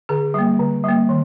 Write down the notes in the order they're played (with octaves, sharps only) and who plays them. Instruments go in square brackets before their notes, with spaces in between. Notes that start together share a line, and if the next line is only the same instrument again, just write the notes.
[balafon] D3 G#4
G3 A#3
D3
G3 A#3
D#3